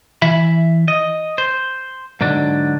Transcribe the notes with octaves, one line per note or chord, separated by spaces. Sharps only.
E3 E5 B5
D#5
C5
G#2 D3 F#3 D4